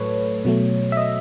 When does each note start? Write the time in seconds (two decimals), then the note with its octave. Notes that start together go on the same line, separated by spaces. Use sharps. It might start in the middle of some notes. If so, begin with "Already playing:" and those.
Already playing: A2 F#3 A3 A4 B4 C#5
0.45 B2 F#3 A3
0.92 E5
0.97 D#5